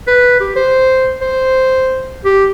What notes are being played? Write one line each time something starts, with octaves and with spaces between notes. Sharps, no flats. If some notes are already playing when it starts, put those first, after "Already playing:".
B4
G4
C5
C5
G4